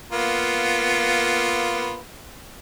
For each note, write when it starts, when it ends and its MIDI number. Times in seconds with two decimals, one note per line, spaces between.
0.12 1.97 58
0.12 1.97 59
0.12 1.97 65